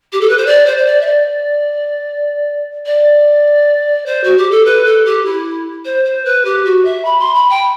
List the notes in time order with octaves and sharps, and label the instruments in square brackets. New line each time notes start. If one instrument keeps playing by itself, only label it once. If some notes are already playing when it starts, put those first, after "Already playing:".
[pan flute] G4
A4
B4
C5
D5
C5
C5
D5
E5
D5
D5
C5
F#4
G4
A4
B4
A4
G4
E4
C5
C5
B4
G4
F#4
E5
B5
C6
B5
G5